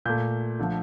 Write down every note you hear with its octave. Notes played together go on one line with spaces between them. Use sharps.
A#2 A3 G6
D3 F3 A3